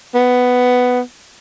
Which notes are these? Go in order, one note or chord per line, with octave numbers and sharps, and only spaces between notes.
B3